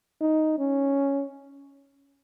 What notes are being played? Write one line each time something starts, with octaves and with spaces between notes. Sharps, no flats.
D#4
C#4